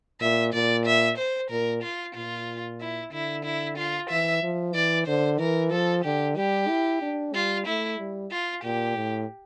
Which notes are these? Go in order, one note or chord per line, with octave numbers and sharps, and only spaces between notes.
A#2 E5
A#2 D5
E5
C5
A#2 A#4
F4
A#2 F4
E4
D3 E4
E4
F4
E3 E5
F3
E3 D5
D3 C5
E3 A#4
F3 A4
D3 G4
G3 G4
E4
D4
G3 F4
A3 E4
G3
F4
A#2 G4
A2